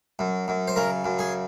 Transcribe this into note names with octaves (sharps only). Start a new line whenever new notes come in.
F#2
F#2
C5
C#3 A#4
F#2
G#4